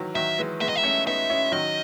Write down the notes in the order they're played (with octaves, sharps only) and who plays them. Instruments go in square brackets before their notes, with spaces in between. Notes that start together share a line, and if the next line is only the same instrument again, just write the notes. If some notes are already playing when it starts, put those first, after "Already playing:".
Already playing: [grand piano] D#3 E3 F#3
[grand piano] D#3 F#3 [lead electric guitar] E5
[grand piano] E3 G#3
[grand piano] G#3 B3 [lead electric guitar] E5
[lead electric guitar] D#5
E5
[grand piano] A3 C#4
[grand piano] B3 D#4 [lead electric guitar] E5
[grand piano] C#4 E4
[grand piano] D#3 F#3 [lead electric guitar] D#5